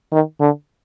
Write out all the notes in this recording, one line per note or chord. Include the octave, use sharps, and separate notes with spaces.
D#3
D3